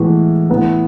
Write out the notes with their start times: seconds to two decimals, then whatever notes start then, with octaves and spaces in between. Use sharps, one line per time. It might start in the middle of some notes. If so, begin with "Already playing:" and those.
Already playing: A2 E3 G#3 B3
0.49 A2 E3 B3